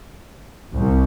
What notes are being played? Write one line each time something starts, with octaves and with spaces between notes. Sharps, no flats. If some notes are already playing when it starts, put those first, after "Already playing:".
C2